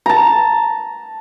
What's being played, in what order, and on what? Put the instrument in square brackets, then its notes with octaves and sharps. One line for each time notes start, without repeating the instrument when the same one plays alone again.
[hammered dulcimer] A5 A#5